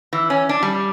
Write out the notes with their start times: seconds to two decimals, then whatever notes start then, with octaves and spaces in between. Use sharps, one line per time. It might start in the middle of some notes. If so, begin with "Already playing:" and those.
0.13 E3
0.30 C#4
0.49 D4
0.63 G3